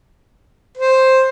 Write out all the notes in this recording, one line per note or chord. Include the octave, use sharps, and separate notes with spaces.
C5